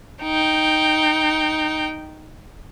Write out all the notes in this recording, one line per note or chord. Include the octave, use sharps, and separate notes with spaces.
D#4 G5